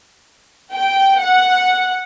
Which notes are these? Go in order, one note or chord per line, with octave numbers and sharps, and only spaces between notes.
G5
F#5